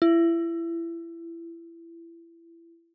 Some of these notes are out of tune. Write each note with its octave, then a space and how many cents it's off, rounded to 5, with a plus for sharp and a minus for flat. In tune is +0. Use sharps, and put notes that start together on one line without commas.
E4 +25